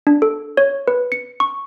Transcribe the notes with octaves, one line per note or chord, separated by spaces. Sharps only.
D4
A4
C#5
B4
C#7
C#6